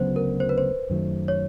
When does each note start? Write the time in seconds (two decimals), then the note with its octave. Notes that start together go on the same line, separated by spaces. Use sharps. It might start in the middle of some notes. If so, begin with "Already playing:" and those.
Already playing: D2 C#3 F#3 B3 C5
0.16 A#4
0.40 C5
0.49 B4
0.58 C5
0.90 F#2 D#3 F#3 A3
1.28 C#5